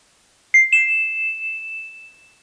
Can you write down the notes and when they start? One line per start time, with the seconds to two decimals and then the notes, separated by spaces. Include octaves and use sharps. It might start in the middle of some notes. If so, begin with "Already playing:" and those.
0.54 C7
0.73 E7